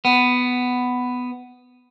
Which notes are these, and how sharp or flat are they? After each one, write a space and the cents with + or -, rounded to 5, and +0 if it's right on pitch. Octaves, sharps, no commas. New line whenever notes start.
B3 +10